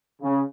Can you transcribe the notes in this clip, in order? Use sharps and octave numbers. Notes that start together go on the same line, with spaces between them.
C#3